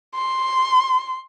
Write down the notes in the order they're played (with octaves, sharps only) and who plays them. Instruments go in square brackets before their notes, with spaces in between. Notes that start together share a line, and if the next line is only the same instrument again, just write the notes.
[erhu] C6